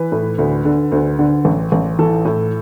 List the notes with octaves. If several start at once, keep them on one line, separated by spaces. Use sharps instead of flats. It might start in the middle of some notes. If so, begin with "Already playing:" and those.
Already playing: E3 B4
A2
D2
D3
D2
D3
A1
A1
E3 A4
A2